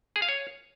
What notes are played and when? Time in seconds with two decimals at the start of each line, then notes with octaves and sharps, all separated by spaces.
0.16 G#4
0.22 F5
0.29 C#5